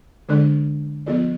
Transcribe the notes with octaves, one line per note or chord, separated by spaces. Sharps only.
D3 G#3 D4 A4 D5
F3 B3 F4 A4 D5